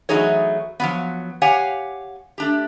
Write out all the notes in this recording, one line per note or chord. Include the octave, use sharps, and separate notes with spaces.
E3 F#3 A3 D#4 G#4 C#5
F3 F#3 B3
G4 C#5 F5 F#5 G#5
A3 D4 G4